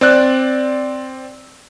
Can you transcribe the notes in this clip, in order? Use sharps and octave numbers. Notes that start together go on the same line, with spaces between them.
C4 D5 F#6